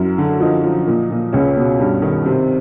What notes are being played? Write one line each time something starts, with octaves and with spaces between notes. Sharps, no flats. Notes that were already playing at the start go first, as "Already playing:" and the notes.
Already playing: F#2 E4
D3
F3 D#4
F3
A#2
A#2
C#2 C#4
B2
G2
D#3
C3 C4